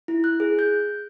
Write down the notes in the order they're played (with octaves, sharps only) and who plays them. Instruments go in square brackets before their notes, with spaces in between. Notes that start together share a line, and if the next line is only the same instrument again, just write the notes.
[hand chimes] E4
F#6
G#4
G6